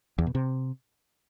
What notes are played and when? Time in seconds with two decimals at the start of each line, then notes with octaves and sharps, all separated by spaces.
0.18 E2
0.27 B2
0.35 C3